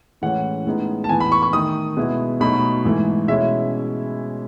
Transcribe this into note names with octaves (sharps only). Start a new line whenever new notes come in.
A2 E3 G#3 C#4 F#5
A2 G#3 B3 D#4
A5
A2 E3 B3 G#5
B5
C#6
C#6
D#3 A3 D#4 D#6
B2 G#3 B3 E4
B2 F#3 A3 D#4 B5
G#2 E3 A3 E4
B2 G#3 C#4 E4 E5